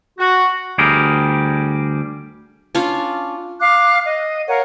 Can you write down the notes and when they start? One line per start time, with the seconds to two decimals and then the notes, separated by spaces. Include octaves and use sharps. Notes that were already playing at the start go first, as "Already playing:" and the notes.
0.19 F#4
0.78 D2 G3 G4 G#4 A#4
2.75 C#4 D4 F4 F5
3.60 F5 D6 F#6
4.04 D#5
4.47 A#4 C#5 F5 F#5